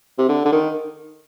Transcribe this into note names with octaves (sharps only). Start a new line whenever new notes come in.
C3
D3
D3
D#3